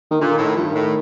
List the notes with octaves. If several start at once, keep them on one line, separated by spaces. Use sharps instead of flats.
D#3
A#2 D3
D#3
A2
D#3
G2 F3
D#3
A2